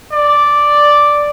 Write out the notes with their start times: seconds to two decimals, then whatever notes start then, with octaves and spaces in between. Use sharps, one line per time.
0.13 D5